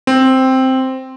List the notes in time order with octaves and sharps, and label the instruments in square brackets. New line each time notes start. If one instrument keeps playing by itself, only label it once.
[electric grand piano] C4